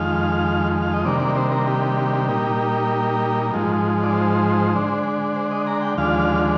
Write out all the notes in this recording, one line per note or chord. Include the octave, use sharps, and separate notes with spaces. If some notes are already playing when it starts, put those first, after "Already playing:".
Already playing: F2 D#3 G#3 F5
F5
D#5
C3 D#3 G3 A#3 D4 D5
D5
C5
A#4
G4
A#2 G3 A#3 D#4
G#2 F3 G#3 D#4
D5
C5
D3 G#3 D4
C5
D#5
A#5
G5
D#2 D3 F3 G#3 D4 F5